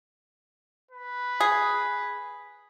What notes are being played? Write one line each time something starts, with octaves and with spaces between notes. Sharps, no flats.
B4
G#4